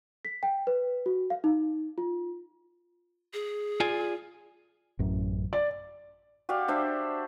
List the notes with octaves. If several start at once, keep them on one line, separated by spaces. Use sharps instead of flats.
B6
G5
B4
F#4
F5
D#4
F4
G#4
F4 D5 G#5
A1 F#2
D5
F#4 G4 D5 F5
D4 C5 E5